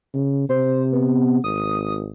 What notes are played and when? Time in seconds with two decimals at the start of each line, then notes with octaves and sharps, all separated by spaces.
0.15 C#3
0.49 C3 C5
0.92 B3
1.44 G#1 D#6